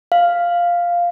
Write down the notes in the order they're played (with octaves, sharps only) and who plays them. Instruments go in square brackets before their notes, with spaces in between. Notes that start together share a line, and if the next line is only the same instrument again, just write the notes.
[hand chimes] F5